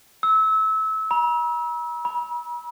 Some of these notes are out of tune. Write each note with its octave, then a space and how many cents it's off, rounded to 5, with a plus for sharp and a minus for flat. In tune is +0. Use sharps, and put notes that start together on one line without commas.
E6 -25
A#5 +45
B5 -45